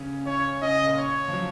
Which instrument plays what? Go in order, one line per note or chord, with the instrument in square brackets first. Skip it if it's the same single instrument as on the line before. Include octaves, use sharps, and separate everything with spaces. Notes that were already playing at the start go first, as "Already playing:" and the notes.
Already playing: [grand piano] C#3 C#4
[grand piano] C#3 C#4 [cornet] C#5
[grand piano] C#3 C#4 [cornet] D#5
[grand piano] A#2 A#3
[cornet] C#5
[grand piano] F3
F#3